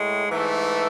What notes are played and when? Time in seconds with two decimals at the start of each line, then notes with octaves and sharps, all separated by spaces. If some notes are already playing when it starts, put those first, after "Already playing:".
Already playing: A2 G#3
0.28 G#2 E3 A3